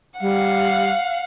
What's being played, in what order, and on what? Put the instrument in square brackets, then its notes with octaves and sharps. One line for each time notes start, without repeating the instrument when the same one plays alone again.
[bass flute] G3 [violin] F5 F#5